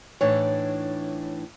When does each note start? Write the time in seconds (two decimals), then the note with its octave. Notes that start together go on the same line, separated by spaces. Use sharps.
0.21 A2 E3 D4 D#4 C#5